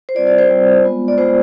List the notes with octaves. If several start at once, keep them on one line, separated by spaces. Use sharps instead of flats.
C5
G3 C4 F4 D5
D5
C5
G3 C4 F4
G#3 B3 F4
D5
G#3 B3 F4 C5